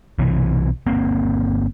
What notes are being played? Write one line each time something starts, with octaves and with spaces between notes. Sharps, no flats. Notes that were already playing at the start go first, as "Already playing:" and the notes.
B1 C3 E3
G1 A#3 C4